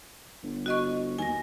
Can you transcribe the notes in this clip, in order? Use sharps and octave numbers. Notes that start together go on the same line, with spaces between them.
G1
F#4 D#5 C#6
D#2 G#5 A#6